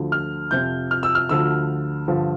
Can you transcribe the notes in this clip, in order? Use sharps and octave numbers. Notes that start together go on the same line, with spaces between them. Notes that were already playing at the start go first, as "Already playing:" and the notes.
Already playing: D2 D3 F3
F6
F2 C3 F3 G6
F6
E6
F6
D2 D3 F3 E6
G2 D3 F3